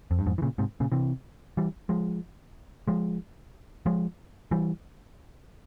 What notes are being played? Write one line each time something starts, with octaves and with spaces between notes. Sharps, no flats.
F2
G2
F2 G#2
E3
A#2 C#3
G#2 C3
A#2 C#3
C3 E3
E3 G3
F3 G#3
F3 G#3
F3 G#3
E3 G3